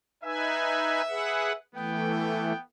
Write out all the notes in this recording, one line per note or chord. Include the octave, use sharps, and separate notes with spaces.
D#4 B4 E5 G#5
G#4 B4 F#5
E3 A3 B3 G5